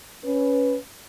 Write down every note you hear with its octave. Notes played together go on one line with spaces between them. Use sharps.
C#4 B4